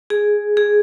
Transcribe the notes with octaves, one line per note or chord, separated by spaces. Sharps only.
G#4
G#4